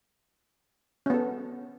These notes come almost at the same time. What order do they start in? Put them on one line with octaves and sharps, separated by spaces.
C#4 B3 A4